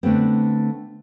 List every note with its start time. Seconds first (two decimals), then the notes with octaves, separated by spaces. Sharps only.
0.03 D3 A3 B3 C4